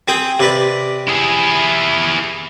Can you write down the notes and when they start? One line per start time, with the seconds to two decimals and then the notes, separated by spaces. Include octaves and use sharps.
0.08 C4 G#4 G5
0.40 C3 B4 D5
1.09 E4 G#4